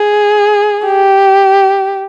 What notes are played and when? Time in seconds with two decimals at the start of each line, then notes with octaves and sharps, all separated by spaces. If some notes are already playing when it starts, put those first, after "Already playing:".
Already playing: G#4
0.85 G4